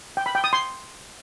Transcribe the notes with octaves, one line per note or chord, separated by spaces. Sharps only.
G5
B5
G5
D#6
C6